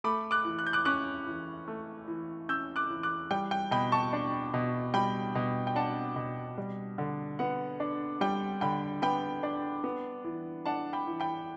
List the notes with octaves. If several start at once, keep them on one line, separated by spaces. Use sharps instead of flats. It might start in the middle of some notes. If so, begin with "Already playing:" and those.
A3 B5 D6
D6 F#6
E3
F#6
G6
D6 F#6
C#4 D6 F#6
E3
A3
E3
C#4 E6 G6
D6 F#6
E3
D6 F#6
G3 G5
G5
B2 G5 B5
A5 C#6
D4
B2
G3 G5 B5
B2
G5
D4 F#5 A5
B2
G3
D3
B3 F#5
D4
G3 G5
D3 G5 B5
B3 G5 B5
D4
B3
E3
D4 F#5 A5
G5 B5
E3
G5 B5